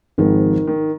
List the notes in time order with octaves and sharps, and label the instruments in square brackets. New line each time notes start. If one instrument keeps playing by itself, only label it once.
[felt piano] G#1 G#2 F3 [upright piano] D#3
[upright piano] D#3